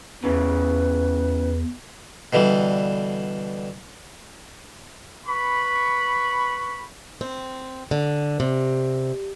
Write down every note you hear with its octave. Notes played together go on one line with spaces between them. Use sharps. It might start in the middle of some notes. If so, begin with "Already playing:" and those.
E2 C#3 E3 B4
B2 D3 E3 G3
B4 B5 C#6
C4
D3
C3